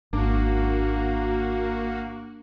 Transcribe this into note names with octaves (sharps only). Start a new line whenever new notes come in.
G#1 A#3 D4 F#4